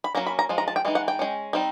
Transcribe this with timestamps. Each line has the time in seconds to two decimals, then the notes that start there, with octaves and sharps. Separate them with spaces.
0.04 B5
0.15 F#3 A#3 C#4 A#5
0.27 B5
0.39 A#5
0.49 F3 G#3
0.58 A#5
0.68 A5
0.76 G5
0.85 E3 G#3 D#4
0.95 F#5
1.08 G5
1.19 G#3 C#4
1.53 G3 C4 D#4